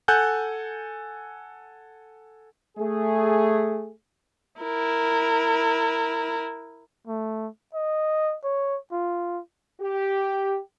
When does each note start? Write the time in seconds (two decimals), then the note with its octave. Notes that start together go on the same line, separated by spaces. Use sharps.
0.08 A4 F#5 G#5 F#6 G6
2.78 A3 G#4
4.61 E4 A#4
7.07 A3
7.74 D#5
8.44 C#5
8.92 F4
9.80 G4